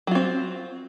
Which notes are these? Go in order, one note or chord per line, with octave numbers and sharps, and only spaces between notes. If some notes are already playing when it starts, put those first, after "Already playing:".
F#3 C4 F4